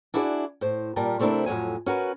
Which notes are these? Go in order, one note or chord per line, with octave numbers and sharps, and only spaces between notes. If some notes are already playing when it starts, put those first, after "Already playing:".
D4 E4 F#4 G#4 C#5 D5
A2 C5
A#2 G3 A#4 A5
C3 A3 C4 D4 E4 A#4
F2 A2 F#3 G#5
C#4 F#4 A#4 B4